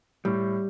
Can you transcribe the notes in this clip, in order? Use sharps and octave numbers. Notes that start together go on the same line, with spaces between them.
A2 G3